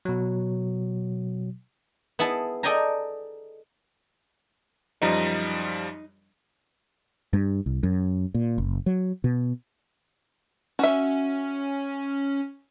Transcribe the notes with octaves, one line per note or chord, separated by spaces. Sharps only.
B2 F#3
B3 E4 G#4 A5
A4 D5 D#5 G5 G#5 A#5
F#2 F3 G3 D#4
G2
C2
F#2
A#2
F#1
F#3
B2
C#4 F#4 E5